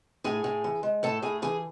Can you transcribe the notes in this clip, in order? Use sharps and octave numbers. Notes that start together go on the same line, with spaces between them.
A2 G#4 G#5
A2
E3
G#3
A2 A4 A5
A2 G#4 G#5
E3 G#4 G#5